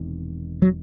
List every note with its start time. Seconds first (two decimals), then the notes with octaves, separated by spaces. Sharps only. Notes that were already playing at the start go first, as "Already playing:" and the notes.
Already playing: E1 E2 C3 D#3
0.62 F#3